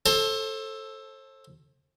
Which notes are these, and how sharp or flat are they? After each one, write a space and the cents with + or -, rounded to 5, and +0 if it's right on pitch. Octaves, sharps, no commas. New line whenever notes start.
A4 +0 C5 +35 A5 -10